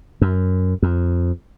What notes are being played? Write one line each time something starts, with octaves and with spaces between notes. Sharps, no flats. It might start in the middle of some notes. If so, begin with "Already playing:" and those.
F#2
F2